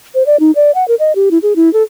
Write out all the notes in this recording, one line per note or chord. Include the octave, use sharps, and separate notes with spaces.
C5
D5
D#4
D5
F#5
A#4
D#5
G4
E4
G#4
E4
A4